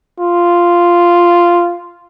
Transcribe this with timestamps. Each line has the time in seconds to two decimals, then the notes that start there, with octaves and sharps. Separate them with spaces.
0.20 F4